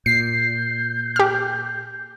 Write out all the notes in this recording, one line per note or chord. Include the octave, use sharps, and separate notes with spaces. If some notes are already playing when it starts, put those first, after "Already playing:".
A#2 G6 C7
G4 F6